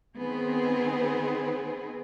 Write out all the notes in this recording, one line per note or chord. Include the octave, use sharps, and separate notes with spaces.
D#3 B3 C4 G#4